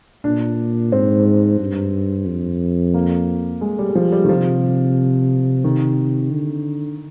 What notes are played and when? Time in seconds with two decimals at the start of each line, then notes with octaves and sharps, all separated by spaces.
0.24 A#2 D4
0.92 G#2 C4
1.59 G2
2.26 F2
2.94 A#3
3.61 G#3
3.79 G3
3.89 G3
3.95 F3
4.12 G3
4.25 D#3
4.28 C3 F3
5.64 D#3
6.32 D3